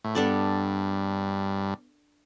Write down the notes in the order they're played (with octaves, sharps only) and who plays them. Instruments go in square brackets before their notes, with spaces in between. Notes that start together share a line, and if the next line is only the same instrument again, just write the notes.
[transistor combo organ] A2
[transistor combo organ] G2 [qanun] B3 D4 A4 D5